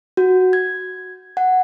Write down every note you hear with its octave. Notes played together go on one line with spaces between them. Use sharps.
F#4
G#6
F#5